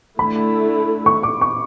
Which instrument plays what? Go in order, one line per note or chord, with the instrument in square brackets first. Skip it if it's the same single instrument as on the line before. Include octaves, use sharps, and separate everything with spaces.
[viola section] D3 A3 E4 [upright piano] B5
[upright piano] C#6
D6
C#6